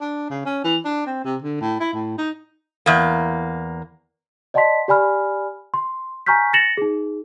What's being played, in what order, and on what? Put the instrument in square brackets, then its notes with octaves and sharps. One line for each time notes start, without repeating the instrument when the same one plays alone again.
[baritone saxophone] D4
C#3
C#4
E3
D4
C4
C3
D3
A2
E4
A2
D#4
[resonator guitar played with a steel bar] E2 A#3
[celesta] D5 D#5 F#5 A5 C6 B6
G4 D5 G#5 B5 F6
C6
G#5 A#5 C#6 F6 G6 B6
A6 A#6 C#7 E7 F#7
D#4 G#4